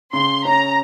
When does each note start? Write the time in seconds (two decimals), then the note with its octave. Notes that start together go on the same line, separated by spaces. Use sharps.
0.13 C#3 C6
0.45 C#4 A#5